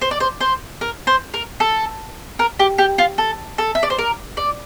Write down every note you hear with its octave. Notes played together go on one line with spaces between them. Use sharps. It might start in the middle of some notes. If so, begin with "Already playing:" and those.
C5
D5
C5
C5
A#4
C5
A#4
A4
A#4
G4
G4
F4
A4
A4
E5
D5
C5
A#4
D5